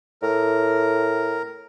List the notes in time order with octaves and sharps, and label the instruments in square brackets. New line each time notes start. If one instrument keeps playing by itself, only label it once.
[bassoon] A2 [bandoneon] A#4